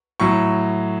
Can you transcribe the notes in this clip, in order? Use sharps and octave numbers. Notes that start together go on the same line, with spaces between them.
A2 F#3 C#6